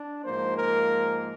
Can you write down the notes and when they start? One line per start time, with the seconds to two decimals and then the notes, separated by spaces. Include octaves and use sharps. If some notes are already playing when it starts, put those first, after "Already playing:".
Already playing: D4
0.25 G#2 F3 A#3 C5
0.57 A#4